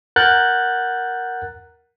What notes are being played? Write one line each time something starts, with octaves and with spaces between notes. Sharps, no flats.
A#4 F#5 F#6 G6 A6